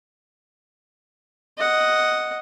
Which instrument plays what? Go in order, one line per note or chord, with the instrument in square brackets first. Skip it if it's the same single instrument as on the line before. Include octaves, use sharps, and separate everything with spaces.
[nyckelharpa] D#5 F#5